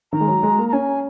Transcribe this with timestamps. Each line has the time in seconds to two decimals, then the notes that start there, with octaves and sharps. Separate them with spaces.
0.12 D#3 A#5
0.20 G#3
0.27 F#3
0.43 G#3
0.58 A#3
0.69 A#5
0.73 C#4 G#5